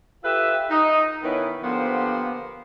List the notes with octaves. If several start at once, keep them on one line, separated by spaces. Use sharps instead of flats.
F4 G4 A4 B4 E5
D#4
D#3 B3 C#4 E4 B4
D3 F3 A#3 B3 G4 C5